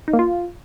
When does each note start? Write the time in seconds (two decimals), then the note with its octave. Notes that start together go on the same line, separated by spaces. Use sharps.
0.08 D#4
0.13 A#3
0.19 F4